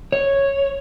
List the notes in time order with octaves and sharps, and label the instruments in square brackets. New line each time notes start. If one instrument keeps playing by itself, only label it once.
[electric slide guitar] C#5